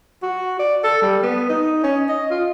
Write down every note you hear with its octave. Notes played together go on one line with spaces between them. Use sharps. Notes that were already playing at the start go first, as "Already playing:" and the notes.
F#4
D5
A4
G3
B3
D#4
C#4
D#5
F4